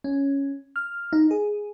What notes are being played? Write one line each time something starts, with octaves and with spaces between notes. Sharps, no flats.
C#4
F6
D#4
G#4